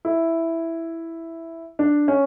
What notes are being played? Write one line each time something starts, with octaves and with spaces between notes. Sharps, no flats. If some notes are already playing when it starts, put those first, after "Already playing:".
E4
D4
C#4